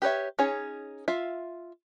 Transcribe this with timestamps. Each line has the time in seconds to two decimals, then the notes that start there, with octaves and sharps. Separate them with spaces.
0.02 G4 B4 C#5 E5
0.39 C#4 D#4 G#4 C#5
1.08 F4 E5 F5